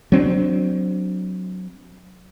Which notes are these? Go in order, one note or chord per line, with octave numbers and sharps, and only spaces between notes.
F#3 C4 D4